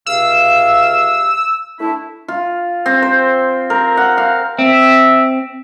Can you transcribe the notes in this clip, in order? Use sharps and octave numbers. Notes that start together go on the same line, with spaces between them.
C#2 C3 F5 E6
A3 D4 E4
F4
C4
C5
A#4
F#5
F5
C4 E5